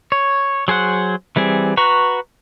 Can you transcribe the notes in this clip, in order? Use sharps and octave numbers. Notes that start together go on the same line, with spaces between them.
C#5
F#3 G#4 C5 F#5
E3 G3 C4 G#4
F#4 B4 A#5 C#6